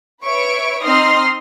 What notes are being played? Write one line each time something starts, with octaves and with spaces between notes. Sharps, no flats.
B4 C#5 E5 C#6 D7
C4 D#4 D#5 C6 D#6 F6